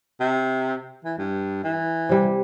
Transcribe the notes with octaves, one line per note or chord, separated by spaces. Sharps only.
C3
E3
G2
E3
C3 G3